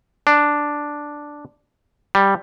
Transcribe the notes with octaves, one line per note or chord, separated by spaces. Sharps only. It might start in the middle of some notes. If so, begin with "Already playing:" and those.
D4
G3